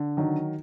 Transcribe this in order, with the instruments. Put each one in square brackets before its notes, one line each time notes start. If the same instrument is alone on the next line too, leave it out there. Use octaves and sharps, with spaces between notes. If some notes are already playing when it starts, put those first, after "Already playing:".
Already playing: [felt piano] D3
[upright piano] D#3 [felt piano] F#3